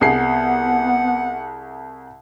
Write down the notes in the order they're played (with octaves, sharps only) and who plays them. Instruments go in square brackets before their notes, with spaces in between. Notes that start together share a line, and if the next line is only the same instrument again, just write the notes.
[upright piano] C2 G#4 C7 [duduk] B3 [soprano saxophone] F#5